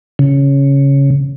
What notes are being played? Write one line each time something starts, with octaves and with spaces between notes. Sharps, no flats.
C#3